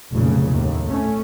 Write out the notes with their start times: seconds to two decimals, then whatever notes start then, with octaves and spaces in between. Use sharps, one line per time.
0.11 F1 B1 A#2 C#3
0.49 D#2 A2
0.88 A2 A3 C#4